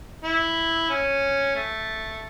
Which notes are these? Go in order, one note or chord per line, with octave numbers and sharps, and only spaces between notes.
E4
C#4
A3